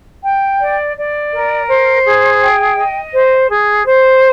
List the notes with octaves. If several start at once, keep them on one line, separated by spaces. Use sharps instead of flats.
G5
D5
D5
A#4
C5
G#4
G5
D#5
C5
G#4
C5